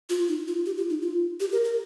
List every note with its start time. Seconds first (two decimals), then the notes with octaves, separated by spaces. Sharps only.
0.10 F4
0.28 D#4
0.48 F4
0.66 G4
0.77 F4
0.90 D#4
1.02 F4
1.40 G4
1.52 A#4
1.64 A#4